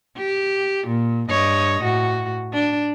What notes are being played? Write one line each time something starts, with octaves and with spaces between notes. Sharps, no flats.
G4
A#2
G2 C#5 D#5
A2 F#4
D4